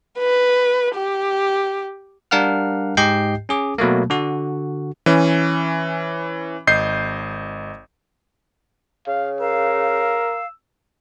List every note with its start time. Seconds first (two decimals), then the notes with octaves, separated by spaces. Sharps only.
0.19 B4
0.95 G4
2.31 G3 D4 A#4 F5 F#5 F6
2.97 G#2 G4 D#5 G5 G6 C7
3.49 C#4 G#4 D6
3.78 B2 F#3 A3 A#3
4.10 D3 F#4
5.06 E3 C#4
6.67 G#1 D#5 G6 C7
9.07 C#3 F5
9.40 A#4 F5 E6